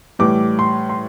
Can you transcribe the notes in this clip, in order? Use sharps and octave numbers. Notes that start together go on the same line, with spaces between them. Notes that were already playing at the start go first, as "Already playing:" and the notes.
A2 E3 G3 D6
C6
C6